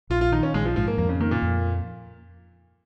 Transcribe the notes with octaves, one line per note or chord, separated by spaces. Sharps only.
A#1 F4
F4
D#3 D#4
C#4
A#1 G#3
F3
G#2 F3
A#3
F2 A#3
C#3
D#3 A#3
A#2
F2